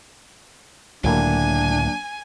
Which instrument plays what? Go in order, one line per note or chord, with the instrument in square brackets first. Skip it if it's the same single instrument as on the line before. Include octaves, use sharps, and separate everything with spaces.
[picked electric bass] C#2 A2 D3 [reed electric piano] F#3 A#3 [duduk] D4 [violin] G#5